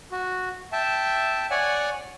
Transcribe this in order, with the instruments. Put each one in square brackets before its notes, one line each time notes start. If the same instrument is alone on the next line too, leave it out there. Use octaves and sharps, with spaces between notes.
[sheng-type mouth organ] F#4
E5 G5 A5
C#5 D5 F#5 G#5